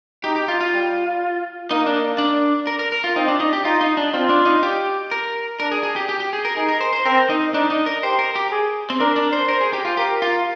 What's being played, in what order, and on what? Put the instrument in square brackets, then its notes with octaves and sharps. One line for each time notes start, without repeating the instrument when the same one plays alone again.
[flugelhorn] D#4 [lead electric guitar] G4
[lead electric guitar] G4
F4
F4
[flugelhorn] G3
[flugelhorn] A#3 [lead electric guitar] D#4
[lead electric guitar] D4
D4
A#4
A#4
A#4
F4
[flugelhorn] C4 [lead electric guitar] D#4
[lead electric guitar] D4
D#4
G4
[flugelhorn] D#4 [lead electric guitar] F4
[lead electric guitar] D#4
D4
[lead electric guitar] C4 [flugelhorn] F4
[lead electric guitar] D4
D#4
G4
A#4
[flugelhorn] D4 [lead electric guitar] A#4
[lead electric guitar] G#4
G#4
G4
G4
G4
G#4
A#4
[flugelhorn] D#4 [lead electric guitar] G#4
[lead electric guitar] A#4
C5
C5
[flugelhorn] C4 [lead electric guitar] A#4
[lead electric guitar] D#4
[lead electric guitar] D4 [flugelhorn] D#4
[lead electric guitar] D#4
A#4
[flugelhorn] G4 [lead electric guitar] C5
[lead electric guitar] A#4
G4
[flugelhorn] G#4
[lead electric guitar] C4
[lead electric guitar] D4 [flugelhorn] A#4
[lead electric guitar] D4
C5
[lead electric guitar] A#4 [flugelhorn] C5
[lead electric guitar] G#4
G4
F4
[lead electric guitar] G4 [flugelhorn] A#4
[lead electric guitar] F4